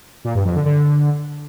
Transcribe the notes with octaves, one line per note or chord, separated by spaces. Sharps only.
A#2
G2
F2
D3
D3